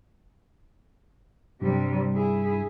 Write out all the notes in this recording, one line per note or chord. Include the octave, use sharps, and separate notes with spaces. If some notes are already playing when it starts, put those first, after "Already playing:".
G2 C3 G3
E4 G#4